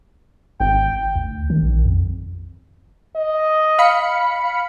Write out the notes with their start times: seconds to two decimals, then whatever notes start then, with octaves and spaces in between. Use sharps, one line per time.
0.60 G#1 G5
1.16 D2
1.50 D#3
1.63 A#1
1.85 F2
3.16 D#5
3.78 F5 B5 C#7